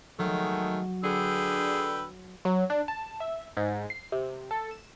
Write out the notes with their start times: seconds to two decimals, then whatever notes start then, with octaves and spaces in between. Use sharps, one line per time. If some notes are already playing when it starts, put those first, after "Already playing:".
0.19 D#3 F#3 G#3 A3
1.04 D3 G#4 B4 G5 E6
2.45 F#3
2.70 D4
2.88 A5
3.20 E5
3.57 G#2
3.90 C7
4.12 C3
4.51 A4
4.71 E7